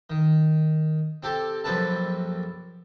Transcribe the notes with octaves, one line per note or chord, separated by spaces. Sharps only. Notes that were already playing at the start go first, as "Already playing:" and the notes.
D#3
C4 G4 A4
A#1 F#2 C4 A4 B4 A5